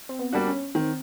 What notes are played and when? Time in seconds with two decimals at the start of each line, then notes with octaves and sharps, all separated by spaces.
0.09 C4
0.19 B3
0.33 G3 A#3 D4 F#4
0.48 C#4
0.75 D#3 C4